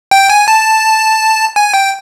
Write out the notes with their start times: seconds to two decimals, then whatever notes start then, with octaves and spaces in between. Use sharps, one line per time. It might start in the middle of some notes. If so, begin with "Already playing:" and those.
0.11 G5
0.30 G#5
0.48 A5
1.56 G#5
1.74 G5